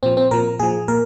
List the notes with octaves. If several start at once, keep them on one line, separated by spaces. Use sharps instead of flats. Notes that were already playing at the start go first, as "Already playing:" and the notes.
A#2 F3 C4
C4
A#2 F3 A#4
A#2 F3 G#4
A#2 A#4